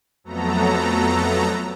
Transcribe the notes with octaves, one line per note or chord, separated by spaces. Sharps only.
F2 F#3 A3 B3 A4 A#5